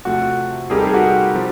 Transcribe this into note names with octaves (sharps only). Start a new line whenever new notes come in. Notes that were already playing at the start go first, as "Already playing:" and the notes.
C3 F3 A3 F#4
G3 C4 D#4 G4 G#4 A#4
A4
G#4
F#4
C3 F3